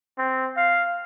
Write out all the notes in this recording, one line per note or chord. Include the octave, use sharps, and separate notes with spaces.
C4
F5